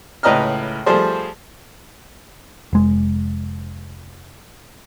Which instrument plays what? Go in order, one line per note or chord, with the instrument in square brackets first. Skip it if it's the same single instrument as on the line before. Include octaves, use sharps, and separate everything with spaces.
[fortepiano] C#2 A2 B4 D#5 A#5 F6
F3 G3 A3 G#4 C5
[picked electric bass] F1 G#3